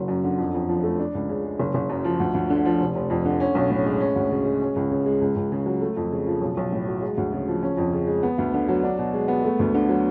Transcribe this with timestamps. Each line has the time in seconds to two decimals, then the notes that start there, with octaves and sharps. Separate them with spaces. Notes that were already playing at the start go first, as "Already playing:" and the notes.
Already playing: F#1 F#3
0.08 F#2
0.24 D3
0.38 F2
0.54 F2
0.69 F3
0.83 A3
0.99 D4
1.15 C#2
1.29 C#3
1.44 G#3
1.60 F#1
1.74 F#1
1.90 F#2
2.04 F3
2.20 D2
2.34 D2
2.50 D3
2.65 F3
2.80 F1
2.95 F1
3.10 F2
3.25 D3
3.40 C#4
3.55 B1
3.70 A2
3.86 G#3
4.00 C#4
4.15 D2
4.31 C#3
4.46 G#3
4.62 C#4
4.76 C#2
4.91 C#3
5.06 G#3
5.21 C#2
5.36 C#2
5.52 C#3
5.66 F#3
5.82 A3
5.97 F2
6.12 C#3
6.27 F3
6.41 B1
6.57 B1
6.72 A2
6.88 F#3
7.02 G#3
7.17 D2
7.33 C#3
7.48 F3
7.63 C#4
7.77 F2
7.93 C#3
8.07 G#3
8.23 B3
8.38 D2
8.53 D3
8.68 F#3
8.83 D4
8.98 B2
9.14 G#3
9.28 B3
9.44 A3
9.59 D2
9.74 D3
9.89 F#3